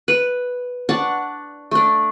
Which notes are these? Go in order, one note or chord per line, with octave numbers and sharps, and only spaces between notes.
B4
D4 F#5 A5 C#6
A3 D4